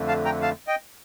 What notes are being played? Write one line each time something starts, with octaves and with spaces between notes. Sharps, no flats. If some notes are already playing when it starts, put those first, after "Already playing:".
Already playing: F2 D3 A3
F5 A5
G5 A#5
F5 A5
D#5 G5